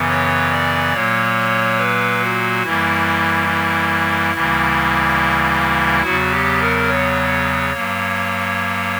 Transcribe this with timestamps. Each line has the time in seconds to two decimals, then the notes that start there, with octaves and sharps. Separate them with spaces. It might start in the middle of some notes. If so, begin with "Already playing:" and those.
Already playing: F#2 C#3 E3 B3
0.09 C#5
0.51 D5
0.93 A#2 F#3 A#3 C#5
1.78 B4
2.21 F#4
2.63 F#2 E3 G3 A#3 E4
3.48 E4
4.32 D2 C#3 E3 G3 A#3
6.02 E2 C#3 F#3 B3 F#4
6.31 G4
6.60 A#4
6.88 C#5
7.73 G2 F#3 A#3